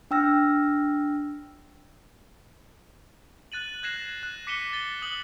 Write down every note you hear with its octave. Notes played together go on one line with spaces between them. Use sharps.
D4 G5 E6 F6 A#6
F#6 A6 D#7 F#7
F#6 G#6 A#6 C7 E7
F#6
D6 B6 C#7 D#7 E7 G7
A6 G7
D#6 F#6 F#7 G7